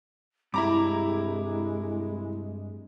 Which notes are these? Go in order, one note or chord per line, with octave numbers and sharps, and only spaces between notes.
C2 G2 G#3 E4 A#5 B5 D6